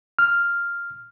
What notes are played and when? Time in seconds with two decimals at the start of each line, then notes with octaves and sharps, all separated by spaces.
0.19 F6